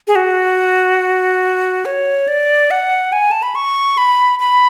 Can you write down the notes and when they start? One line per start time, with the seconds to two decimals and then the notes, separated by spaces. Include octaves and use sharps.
0.08 G#4
0.16 F#4
1.85 C#5
2.28 D5
2.71 F#5
3.12 G#5
3.31 A5
3.43 B5
3.55 C#6
3.98 B5
4.40 B5